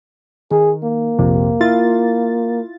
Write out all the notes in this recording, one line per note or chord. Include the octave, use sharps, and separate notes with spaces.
D#3 G#4
A#3
A#1 F2 C3
E4 F4 A6